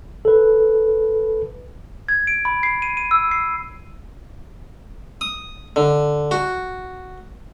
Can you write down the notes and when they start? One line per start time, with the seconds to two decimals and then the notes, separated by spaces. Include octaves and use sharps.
0.25 A4 B4
2.08 G#6
2.27 D7
2.45 B5
2.63 C7
2.82 D#7
2.97 D#7
3.11 E6
3.31 C7
5.21 D#6
5.76 D3
6.31 F#4